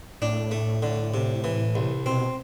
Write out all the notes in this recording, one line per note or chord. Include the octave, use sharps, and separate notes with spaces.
A2 D4
A3
D3
C3
E3
C2
B2 C4